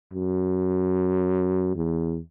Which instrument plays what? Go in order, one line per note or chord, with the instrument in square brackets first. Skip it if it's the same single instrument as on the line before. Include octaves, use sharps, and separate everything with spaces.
[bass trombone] F#2
E2